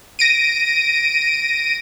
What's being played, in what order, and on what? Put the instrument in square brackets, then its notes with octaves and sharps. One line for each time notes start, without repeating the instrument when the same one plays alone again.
[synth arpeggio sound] A#6 D7 D#7